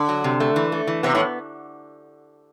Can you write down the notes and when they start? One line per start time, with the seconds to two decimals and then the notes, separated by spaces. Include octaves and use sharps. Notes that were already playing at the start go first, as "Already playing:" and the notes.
Already playing: D3
0.09 F#3
0.24 C3
0.40 A3
0.56 E3
0.72 A3
0.87 E3
1.03 C3 B3
1.15 A2